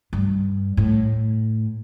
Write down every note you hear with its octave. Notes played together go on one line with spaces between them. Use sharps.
G2
A2